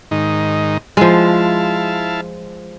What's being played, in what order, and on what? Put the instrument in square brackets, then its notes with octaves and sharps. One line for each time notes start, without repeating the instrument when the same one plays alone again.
[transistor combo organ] G#2 D#3 D#4
[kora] F3 G#3 [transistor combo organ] E4 F5 A5